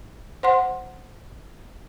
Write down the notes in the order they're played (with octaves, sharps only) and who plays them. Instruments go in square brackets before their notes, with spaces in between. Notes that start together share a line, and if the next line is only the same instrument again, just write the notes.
[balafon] C5 F#5 C6